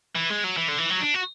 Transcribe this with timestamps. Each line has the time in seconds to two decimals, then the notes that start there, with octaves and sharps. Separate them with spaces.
0.15 E3
0.30 G#3
0.44 F#3
0.57 E3
0.68 D3
0.78 E3
0.90 F#3
1.00 D4
1.14 F#4